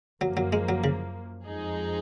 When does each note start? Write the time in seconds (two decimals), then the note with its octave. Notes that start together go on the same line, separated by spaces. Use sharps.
0.21 F#2 F3 F#3 A#3
0.37 F#3
0.53 G#3
0.69 F#3
0.84 C#3
1.46 F2 F3 G#3 D#4 G#4